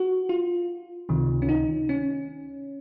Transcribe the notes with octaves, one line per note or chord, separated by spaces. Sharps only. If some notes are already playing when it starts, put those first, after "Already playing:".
Already playing: F#4
F4
C#2 C3 D#3
C#4
D#4
C#4